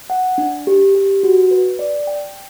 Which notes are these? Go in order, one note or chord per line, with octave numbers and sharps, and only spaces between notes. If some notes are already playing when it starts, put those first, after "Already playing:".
F#5
D4
G4
G4
F#4
B4
D5
G5